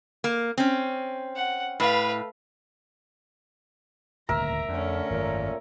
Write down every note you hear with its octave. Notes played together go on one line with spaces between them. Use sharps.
A#3
C4 C#4
F#5
A2 B4 F5
D#1 D2 G#2 A#4 E5 A#5
F2 D3 A3 C#4
G#1 F#2 A#2